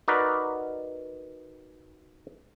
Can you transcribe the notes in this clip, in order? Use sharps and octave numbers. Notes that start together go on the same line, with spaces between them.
D#4 F#4 A#4 B4 D5